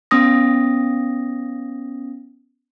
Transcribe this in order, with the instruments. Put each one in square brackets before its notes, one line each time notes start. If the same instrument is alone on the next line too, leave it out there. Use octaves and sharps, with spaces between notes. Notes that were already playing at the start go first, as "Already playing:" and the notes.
[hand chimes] B3 C#4 D#6 A#6